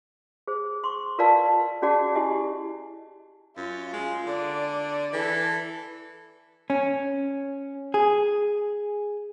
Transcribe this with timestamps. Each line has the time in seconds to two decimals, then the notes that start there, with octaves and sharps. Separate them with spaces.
0.47 G#4 C5
0.84 C6 C#6
1.19 F4 A#4 B4 D5 F5 A5
1.82 C#4 F#4 G#4 D5 F#5 A5
2.15 E4 G4 D#5 G#5
3.57 F#2 F4
3.93 G#3
4.27 D3 D5
5.13 E3 A4
6.70 C#4
7.94 G#4